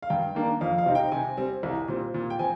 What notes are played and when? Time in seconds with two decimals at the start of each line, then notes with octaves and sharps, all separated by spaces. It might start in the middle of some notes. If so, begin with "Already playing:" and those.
0.02 F5
0.10 G2 G5
0.35 D#3 A#3 D4
0.61 F2 F5
0.78 F5
0.86 C3 G3 C4 D#4
0.95 G5
1.12 C3 G#5
1.37 G3 C4
1.63 C2
1.88 A#2 G3 C4
2.14 A#2
2.30 G5
2.39 F3 C4 G#5